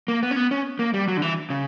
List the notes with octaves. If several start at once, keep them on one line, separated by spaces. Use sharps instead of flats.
A#3
B3
C#4
B3
C#4
A#3
G3
F#3
D3
E3
C#3